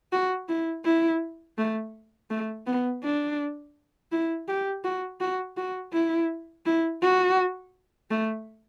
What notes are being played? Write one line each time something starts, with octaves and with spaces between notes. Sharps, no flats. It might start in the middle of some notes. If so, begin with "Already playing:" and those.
F#4
E4
E4
A3
A3
B3
D4
E4
G4
F#4
F#4
F#4
E4
E4
F#4
A3